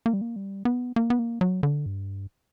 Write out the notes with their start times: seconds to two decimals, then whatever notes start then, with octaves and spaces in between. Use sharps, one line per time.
0.06 A#3
0.13 G3
0.21 A#3
0.36 G3
0.65 B3
0.96 A#3
1.10 B3
1.19 A#3
1.41 F#3
1.63 D3
1.86 G2